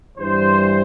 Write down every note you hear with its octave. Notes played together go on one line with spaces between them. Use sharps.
G2 E3 G3 C5